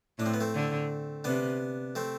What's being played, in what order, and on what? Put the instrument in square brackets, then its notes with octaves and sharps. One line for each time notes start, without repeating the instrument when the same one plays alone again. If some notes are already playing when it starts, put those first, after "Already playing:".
[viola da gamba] A2 [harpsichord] D4
[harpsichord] C4
B3
A3 C4
[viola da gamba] D3
[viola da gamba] C3 [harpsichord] B3 D4
[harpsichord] A3 C4